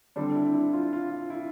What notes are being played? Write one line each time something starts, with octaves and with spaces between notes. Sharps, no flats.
D3 G3 C4 D4
E4
E4
F4
F4
E4